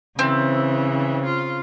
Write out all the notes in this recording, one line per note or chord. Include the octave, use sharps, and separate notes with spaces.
C#3 E3 C4
F4